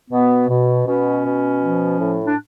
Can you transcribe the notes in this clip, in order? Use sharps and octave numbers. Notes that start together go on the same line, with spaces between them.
B2 B3
B2
B2 C#4
B2
F3
A2
D4